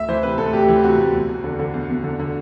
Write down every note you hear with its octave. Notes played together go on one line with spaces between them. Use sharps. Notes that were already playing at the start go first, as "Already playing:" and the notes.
Already playing: D2 E5
E3 C5
C3 B4
D2 A4
D2 G4
E3
C3 F#4
D2
E2
E2
D3
D3
E2
E2
D3
D3